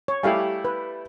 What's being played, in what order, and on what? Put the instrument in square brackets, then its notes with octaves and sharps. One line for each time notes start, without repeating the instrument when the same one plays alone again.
[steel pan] C#5
[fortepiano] G3 A3 E4 [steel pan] G4 F5 G#5
[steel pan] B4